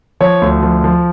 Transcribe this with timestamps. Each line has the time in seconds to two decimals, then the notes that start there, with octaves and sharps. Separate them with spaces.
0.20 F3 C#5
0.42 D2
0.63 F3
0.84 F3